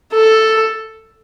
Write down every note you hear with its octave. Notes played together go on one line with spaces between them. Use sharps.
A4